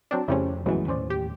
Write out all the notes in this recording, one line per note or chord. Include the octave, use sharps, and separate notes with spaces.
F#3 C4 D4
F2 C#3 G3 A3 C4 C#4 E4
A#1 F#2 E3 F#3 G#3 A3 B3
D#2 A2 C#4 C5 D5
G4